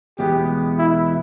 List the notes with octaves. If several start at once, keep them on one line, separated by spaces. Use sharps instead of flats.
E2 B2 G#3 B3 G4
E4